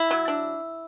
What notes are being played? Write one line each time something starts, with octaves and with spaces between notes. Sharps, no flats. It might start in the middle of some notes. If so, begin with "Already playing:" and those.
Already playing: E4
F#3
D4